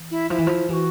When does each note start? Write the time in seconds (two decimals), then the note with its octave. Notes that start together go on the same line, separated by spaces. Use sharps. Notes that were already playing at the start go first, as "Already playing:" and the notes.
Already playing: E3
0.11 E4
0.30 F3 E4
0.38 E3
0.47 F3
0.69 E3 G4
0.73 F#4